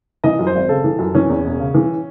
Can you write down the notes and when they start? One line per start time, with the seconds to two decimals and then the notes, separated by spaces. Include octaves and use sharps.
0.24 E3 D#5
0.39 F#2
0.47 C5
0.55 G#1
0.69 C#3 A4
0.84 E3
0.99 F#2
1.15 E3 C#4
1.29 E2
1.45 E1
1.60 C#3
1.74 E3